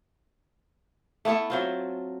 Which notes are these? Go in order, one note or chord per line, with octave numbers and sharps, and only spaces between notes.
A3 B3 E4 A4
F#3 C4 F4